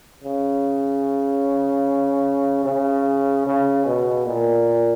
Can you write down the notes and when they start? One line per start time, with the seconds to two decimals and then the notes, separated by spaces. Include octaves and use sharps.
0.24 C#3
2.65 C#3
3.46 C#3
3.86 B2
4.26 A#2